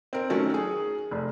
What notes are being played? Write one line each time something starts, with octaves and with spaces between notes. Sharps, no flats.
C4 A#4
D#3 F#3 A3 C#4
G#4
F1